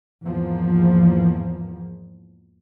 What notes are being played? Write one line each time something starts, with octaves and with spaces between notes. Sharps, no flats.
E2 G#2 F3 A#3